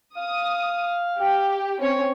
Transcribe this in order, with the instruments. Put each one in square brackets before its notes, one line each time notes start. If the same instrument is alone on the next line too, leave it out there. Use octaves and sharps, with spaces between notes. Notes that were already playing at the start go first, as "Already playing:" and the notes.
[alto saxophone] F5 [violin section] D#6
[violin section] G4
C4 C#4 C#5